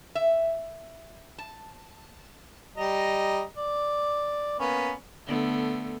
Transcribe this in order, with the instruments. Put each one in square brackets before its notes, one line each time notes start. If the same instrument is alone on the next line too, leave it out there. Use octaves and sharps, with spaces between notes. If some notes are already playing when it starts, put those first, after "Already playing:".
[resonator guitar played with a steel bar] E5
A5
[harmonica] G3 D#5 A#5
D5
A#3 B3 C#4
[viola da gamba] D3 A3 B3